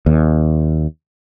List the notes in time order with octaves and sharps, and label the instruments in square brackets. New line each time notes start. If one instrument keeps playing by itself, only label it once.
[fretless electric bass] D#2